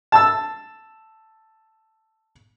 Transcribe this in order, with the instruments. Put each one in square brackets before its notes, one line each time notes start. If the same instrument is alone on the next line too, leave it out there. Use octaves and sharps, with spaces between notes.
[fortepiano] A5 E6